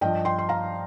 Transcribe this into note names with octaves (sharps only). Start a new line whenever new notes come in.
G2 F3 D#5 G5
G5 C6
C6
F5 A#5